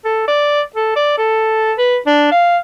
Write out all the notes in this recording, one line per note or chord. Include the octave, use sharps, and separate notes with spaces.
A4
D5
A4
D5
A4
B4
D4
F5